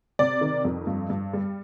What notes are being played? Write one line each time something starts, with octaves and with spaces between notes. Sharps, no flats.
C3 D5
D#3
F2
G2
G2
G3